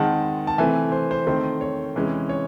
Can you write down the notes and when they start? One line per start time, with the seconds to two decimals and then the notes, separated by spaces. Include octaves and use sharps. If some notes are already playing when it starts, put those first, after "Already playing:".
Already playing: D#3 G#3 C4 F#5 A5
0.47 A5
0.58 C3 E3 A3 C4 E5 G#5
0.92 C5
1.11 C5
1.27 D#3 A3 C4
1.61 C#5
1.95 C3 E3 G#3 C#4
2.29 C#5